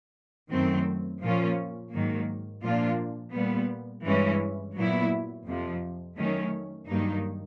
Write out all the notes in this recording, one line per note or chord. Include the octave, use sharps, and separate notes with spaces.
F#2 D#3 F#3 A3 C4
A#2 F3 A#3 C#4 F4
G#2 D#3 F#3 A#3
A#2 F3 A#3 D4 F4
A#2 G3 B3
G2 E3 G#3 C#4
A#2 F#3 B3 E4
F2 C3 F3
D#3 F#3 A3 C#4
G2 D#3 F#3 A#3 D#4